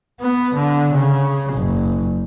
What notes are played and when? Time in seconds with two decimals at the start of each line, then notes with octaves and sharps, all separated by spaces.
0.20 B3
0.55 D3
0.94 C#3
1.54 F#1